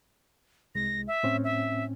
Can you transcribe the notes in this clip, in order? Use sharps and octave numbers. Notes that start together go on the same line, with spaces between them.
C2 G#3 A#6
E5
A2 C4 C#4
E5